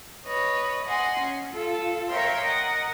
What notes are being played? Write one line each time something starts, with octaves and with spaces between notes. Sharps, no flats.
B4 C#5 D#5
D#5 F#5 G#5 C6
C#4
F4 A4
A#4 C#5 E5 F5 G5 C6
A#4 D#5 F#5